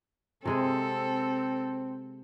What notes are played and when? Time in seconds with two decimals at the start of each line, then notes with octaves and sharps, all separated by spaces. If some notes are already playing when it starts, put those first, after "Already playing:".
0.45 C3 G#3 C4 G#4 A4